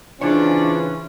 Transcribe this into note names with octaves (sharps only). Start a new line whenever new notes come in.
C#3 E3 C#4 D4 E4 F4 C5 C#5